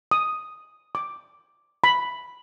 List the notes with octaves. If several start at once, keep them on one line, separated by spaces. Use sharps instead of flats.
D#6
D6
B5